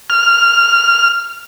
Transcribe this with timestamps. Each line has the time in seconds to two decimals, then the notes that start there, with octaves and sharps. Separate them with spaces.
0.10 F6